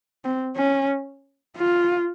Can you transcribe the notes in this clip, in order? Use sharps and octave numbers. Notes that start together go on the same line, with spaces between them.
C4
C#4
F4